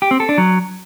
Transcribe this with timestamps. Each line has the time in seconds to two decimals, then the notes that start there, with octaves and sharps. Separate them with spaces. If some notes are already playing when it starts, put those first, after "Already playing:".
0.02 G4
0.11 C4
0.20 A4
0.29 D4
0.38 F#3